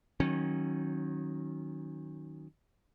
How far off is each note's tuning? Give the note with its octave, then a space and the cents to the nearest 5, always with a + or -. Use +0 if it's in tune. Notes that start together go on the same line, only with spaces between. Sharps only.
D#3 +0 F#3 +0 C#4 -30